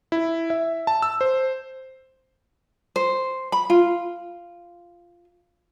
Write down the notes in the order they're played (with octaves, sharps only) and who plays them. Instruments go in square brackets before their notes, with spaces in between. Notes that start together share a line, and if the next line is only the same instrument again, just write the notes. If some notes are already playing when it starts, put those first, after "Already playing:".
[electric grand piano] E4
E5
A5
E6
C5
[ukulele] C5
B5
F4